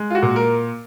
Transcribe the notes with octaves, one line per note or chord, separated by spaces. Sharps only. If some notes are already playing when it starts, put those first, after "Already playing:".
Already playing: G#3
F4
F#4
A#2
A#4